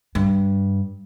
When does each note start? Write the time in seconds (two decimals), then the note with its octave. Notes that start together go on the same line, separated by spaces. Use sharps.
0.15 G2